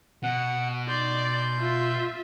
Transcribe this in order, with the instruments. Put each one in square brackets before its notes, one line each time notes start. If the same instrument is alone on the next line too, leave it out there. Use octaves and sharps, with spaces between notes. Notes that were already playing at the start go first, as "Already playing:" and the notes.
[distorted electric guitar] B2 [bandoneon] F#5
[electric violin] D#4 D5 [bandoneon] C6 G6
[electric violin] F4 E5